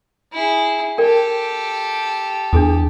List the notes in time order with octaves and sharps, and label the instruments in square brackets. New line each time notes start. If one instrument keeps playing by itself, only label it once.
[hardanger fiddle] E4 G#4
[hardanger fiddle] G4 A4 [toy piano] A#4 D5 G5
[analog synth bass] E2 [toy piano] D4 G#4 D#6